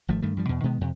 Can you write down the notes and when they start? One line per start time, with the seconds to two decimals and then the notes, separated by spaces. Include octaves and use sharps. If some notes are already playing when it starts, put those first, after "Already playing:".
0.08 G#1 F3 A3
0.22 G2 D#3 A3
0.37 G2 F3 G3
0.49 E2 B2
0.64 B2 D#3 G#3 B3
0.81 F2 C3